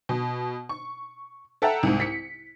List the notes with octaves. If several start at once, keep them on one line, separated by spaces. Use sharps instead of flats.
B2
C#6
A4 E5 F#5 G5 A5 A#5
C2 G#2
B6 C#7